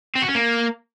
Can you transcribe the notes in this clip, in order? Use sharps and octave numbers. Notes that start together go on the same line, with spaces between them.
C4
F#4
C#4
A#3